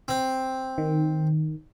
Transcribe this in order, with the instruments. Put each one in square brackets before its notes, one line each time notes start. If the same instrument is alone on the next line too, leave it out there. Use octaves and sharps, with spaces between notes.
[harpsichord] C4
[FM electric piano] D#3